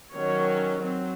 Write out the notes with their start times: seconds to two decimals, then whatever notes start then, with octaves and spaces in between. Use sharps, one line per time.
0.14 D#3 F#3 C#4 C#5
0.84 F#3 C4